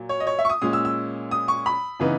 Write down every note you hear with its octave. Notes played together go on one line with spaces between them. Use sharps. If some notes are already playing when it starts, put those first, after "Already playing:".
Already playing: A#2 F#3
C#5
D#5
C#5
E5
C#6
D#6
A#2 G#3 C#4 D#6
E6
E6
D#6
C#6
B5
C#3 E3 B3 D#4